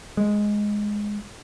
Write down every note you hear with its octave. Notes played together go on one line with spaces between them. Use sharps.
G#3